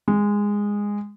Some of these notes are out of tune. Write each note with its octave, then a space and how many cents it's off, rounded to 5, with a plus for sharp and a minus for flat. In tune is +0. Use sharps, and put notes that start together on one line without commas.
G#3 -15